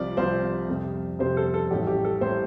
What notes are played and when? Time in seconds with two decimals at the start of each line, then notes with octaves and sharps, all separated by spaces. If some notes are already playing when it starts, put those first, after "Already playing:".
Already playing: C2 C3 F3 D5
0.17 C2 C3 F3 C5
0.68 F2 C3 G3
1.19 F2 C3 G3 C5
1.37 A4
1.54 A4
1.71 A1 A2 G3 G4
1.87 G4
2.04 A4
2.21 A2 G3 C5